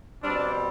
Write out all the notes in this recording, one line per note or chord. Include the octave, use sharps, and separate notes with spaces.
B2 G3 C4 D4